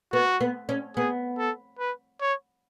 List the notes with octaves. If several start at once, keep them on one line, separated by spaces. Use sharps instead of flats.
B3 F#4
B3
C#4
B3 G#4
A4
B4
C#5